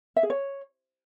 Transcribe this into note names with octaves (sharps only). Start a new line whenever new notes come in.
E5
G#4
C#5